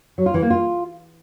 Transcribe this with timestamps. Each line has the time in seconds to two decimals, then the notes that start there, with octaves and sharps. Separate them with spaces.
0.18 F#3
0.26 F4
0.34 E3
0.42 A#3
0.50 F4